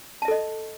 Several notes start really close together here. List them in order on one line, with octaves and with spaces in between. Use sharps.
A5 E5 A4 D#5